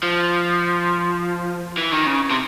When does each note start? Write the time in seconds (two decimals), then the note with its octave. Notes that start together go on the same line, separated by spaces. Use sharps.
0.03 F3
1.77 E3
1.92 D#3
2.06 C#3
2.31 C3